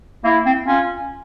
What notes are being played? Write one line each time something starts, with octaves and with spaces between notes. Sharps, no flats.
A#3 E4
C4
C#4 F4